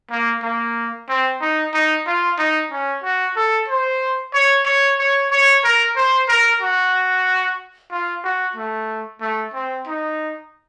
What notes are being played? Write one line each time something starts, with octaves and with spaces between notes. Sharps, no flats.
A#3
A#3
C4
D#4
D#4
F4
D#4
C#4
F#4
A4
C5
C#5
C#5
C#5
C#5
A#4
C5
A#4
F#4
F4
F#4
A3
A3
C4
D#4